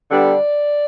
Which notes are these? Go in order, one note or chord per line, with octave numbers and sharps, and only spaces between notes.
D3 G3 B3 D4 D5